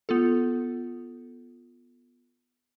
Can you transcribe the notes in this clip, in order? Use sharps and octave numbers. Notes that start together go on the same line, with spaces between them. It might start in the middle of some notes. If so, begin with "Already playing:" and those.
B3 F4 A4